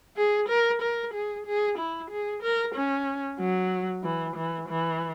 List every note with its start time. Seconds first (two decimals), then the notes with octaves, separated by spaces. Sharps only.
0.17 G#4
0.48 A#4
0.82 A#4
1.14 G#4
1.46 G#4
1.78 E4
2.10 G#4
2.42 A#4
2.75 C#4
3.40 F#3
4.03 E3
4.36 E3
4.69 E3